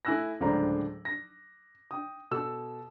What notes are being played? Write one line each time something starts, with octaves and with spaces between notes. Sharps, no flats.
A3 E4 G#5 E6 F#6 A#6
D1 C#2 A3 D4 C5 A#5
A#6
G5 D#6
B2 A4 E6